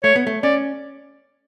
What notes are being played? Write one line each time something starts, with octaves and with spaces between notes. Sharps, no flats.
A3 C#5
B3
A3
C#4 D5